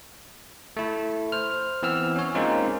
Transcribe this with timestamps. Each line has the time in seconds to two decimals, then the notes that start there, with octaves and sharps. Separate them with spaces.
0.77 A3 E4
1.32 C5 F6
1.83 E3 B3 C4 E6 F6
2.16 C#4 C#5
2.35 G#3 A#3 C4 C#4 D#4 F4